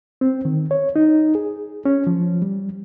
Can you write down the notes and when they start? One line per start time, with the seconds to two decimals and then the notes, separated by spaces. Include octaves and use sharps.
0.21 C4
0.45 D#3
0.71 C#5
0.96 D#4
1.35 G#4
1.85 C#4
2.07 F3
2.42 G3